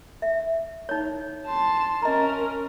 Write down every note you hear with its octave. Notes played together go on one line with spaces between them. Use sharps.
E5
D#4 C#5
A5 C6
C#4 A#4 D#5 A#5